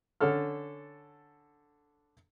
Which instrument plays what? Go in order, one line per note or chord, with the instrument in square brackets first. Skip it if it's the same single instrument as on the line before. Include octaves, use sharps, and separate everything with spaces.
[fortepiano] D3 C#4 A4 F6